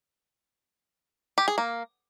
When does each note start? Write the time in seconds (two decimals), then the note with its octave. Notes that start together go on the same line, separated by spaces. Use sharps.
1.38 G4
1.48 G#4
1.58 A#3